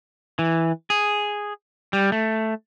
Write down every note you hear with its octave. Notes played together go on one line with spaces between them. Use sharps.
E3
G#4
G3
A3